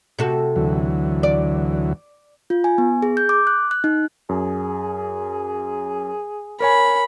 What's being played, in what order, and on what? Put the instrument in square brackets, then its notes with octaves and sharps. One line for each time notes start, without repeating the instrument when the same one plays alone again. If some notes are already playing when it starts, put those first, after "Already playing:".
[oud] C3 F#4 A4
[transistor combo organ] D2 E3 F#3
[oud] D5
[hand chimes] F4
G#5
B3
G#4
G6
D6
F#6
F#6
D#4
[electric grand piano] F#2 [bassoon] G#4
[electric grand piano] A#4 C#5 G#5 [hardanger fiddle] B5